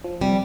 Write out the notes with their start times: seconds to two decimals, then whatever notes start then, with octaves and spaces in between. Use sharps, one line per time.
0.04 F3
0.21 C3 G3